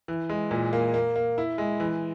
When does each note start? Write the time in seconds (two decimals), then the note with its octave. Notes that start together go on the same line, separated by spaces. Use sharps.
0.08 E3
0.30 G#3
0.51 A#2
0.73 A#3
0.94 A#3
1.16 A#3
1.38 E4
1.58 G#3
1.80 E3